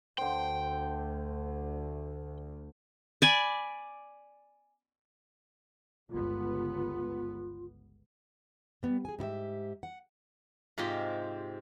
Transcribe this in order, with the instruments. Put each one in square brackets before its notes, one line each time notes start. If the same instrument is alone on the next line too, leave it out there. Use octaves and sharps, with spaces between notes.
[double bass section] D2 [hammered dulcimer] D3 C5 [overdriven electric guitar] G5
[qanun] D5 G#5 B5
[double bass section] G1 C#2 B3 [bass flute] F4
[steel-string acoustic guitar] G3 B3
G#4 G#5
G#2 E4 G4 E5
F#5
[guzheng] G#2 G4 [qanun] C3 F4 D#5